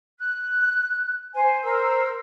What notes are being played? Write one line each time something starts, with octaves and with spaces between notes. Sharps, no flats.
F#6
C5 G#5
A#4 C5 E6